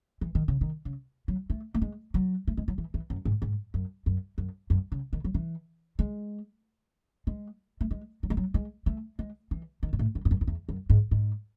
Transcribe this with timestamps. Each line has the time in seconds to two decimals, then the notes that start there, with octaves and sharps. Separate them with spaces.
0.21 E3
0.35 D#3
0.48 C#3
0.61 D#3
0.85 C#3
1.28 F#3
1.50 A3
1.74 A3
1.82 G#3
2.14 F#3
2.48 A3
2.57 G#3
2.68 F#3
2.78 E3
2.94 E3
3.10 F#2
3.25 G#2
3.42 G#2
3.74 F#2
4.06 F#2
4.38 F#2
4.70 F#2
4.92 C#3
5.13 D#3
5.24 F#3
5.34 E3
5.99 G#3
7.27 G#3
7.81 A3
7.91 G#3
8.23 F#3
8.30 G#3
8.37 F#3
8.54 G#3
8.86 A3
9.19 G#3
9.51 E3
9.83 D#3
9.93 G#2
9.99 A2
10.15 F#2
10.25 G#2
10.31 F#2
10.41 F#2
10.47 E2
10.69 F#2
10.90 G#2
11.11 G#2